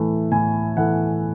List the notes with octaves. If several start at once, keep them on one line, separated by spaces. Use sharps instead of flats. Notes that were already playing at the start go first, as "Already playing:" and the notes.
Already playing: A2 E3 A3
A2 G#5
E3 A3 F#5